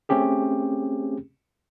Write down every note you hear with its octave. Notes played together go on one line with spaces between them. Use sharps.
A3 C4 C#4 G4 G#4